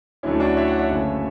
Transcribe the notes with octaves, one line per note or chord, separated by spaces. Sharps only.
D2 D3 F#3 A3 C#4 E4
D4 F#4
C#5 E5
D5 F#5
C#5 E5
F#1 F#2 D3 A3